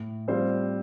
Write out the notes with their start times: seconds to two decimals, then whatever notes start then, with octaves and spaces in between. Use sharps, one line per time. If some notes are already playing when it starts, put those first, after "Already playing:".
Already playing: A2
0.28 G3 C4 F4 C5